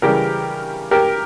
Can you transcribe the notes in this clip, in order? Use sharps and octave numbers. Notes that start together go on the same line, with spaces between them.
C#3 E3 G3 G4 A#4
G4 A#4